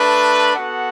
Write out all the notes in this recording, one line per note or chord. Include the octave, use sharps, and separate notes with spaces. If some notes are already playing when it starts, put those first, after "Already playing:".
Already playing: A3 D4 B4
B3 F#4 A4 F#5